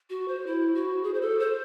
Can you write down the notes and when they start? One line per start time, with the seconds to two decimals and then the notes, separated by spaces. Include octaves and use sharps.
0.10 F#4
0.28 C5
0.47 E4
0.75 F#4
1.03 G#4
1.14 C5
1.21 A4
1.39 C5